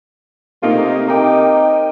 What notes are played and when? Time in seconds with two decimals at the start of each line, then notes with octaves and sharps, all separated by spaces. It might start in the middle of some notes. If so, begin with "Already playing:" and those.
0.63 C3 A3 A#3 D#4 F4
1.08 D#4 A#4 G5 D6